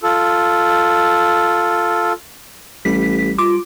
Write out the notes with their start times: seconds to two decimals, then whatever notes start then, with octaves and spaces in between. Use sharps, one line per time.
0.03 F4 A4
2.85 A1 G3 B6
3.38 F4 D6